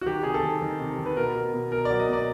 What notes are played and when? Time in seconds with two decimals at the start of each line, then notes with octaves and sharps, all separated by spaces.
0.01 F#4
0.06 D#3 G4
0.23 C3 G#4
0.34 A4
0.43 D#3
0.62 D#3
0.80 C3
0.98 D#3
1.06 B4
1.17 B2 A#4
1.35 B2
1.54 B2
1.72 B2 A#4
1.85 D5
1.90 F#3
1.99 D#5
2.09 B2 D5